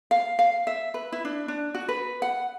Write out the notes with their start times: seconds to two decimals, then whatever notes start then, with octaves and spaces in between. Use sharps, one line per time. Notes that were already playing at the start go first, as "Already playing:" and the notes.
0.11 F5
0.39 F5
0.67 E5
0.94 B4
1.12 E4
1.25 D4
1.48 D4
1.75 F#4
1.89 B4
2.22 F#5